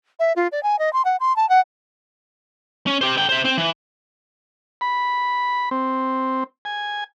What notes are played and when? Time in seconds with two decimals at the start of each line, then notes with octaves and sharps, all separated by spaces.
0.19 E5
0.36 F4
0.52 D5
0.63 G#5
0.79 D#5
0.93 C6
1.05 F#5
1.20 C6
1.36 A5
1.49 F#5
2.87 C#4
3.01 G4 C5
3.17 D3 G5
3.29 C5 E5
3.45 C4 C5
3.58 E3
4.81 B5
5.71 C4
6.65 G#5